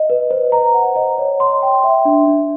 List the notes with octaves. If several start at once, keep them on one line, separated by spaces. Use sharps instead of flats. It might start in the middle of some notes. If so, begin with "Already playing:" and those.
Already playing: D#5
B4
C5
A#5
F#5
D#5
C#5
C6
G5
E5
D4
D4